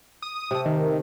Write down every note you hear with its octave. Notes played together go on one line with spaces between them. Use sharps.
D#6
C3 A3
D#3